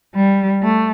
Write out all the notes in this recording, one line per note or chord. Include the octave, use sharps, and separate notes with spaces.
G3
A3